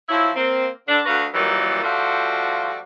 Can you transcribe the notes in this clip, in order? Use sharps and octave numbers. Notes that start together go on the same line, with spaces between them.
F3 F#3 E4
A#3 C4
D3 D4
D2 D3 F#4 B4 F5
A#2 D#3 E3 F#3 G3
F3 G3 A3 F4 F#4